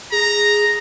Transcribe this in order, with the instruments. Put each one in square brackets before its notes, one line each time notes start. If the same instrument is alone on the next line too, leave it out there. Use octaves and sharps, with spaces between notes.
[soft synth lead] G#4 [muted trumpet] A#5